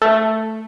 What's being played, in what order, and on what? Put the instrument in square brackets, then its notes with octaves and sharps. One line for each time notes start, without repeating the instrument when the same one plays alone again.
[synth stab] A3